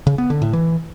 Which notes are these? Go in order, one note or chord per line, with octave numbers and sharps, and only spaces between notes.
C#3
B3
D3
A2
E3